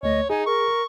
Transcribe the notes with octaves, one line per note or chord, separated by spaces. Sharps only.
D2 A3 C#5 D#5
D#4 G#4 G#5
A#4 C#6